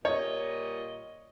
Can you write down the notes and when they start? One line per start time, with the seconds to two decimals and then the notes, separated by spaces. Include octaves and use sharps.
0.05 A#2 G3 C#5 D#5